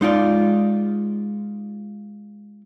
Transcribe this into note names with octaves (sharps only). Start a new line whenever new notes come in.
G#3 D#4 F4 D5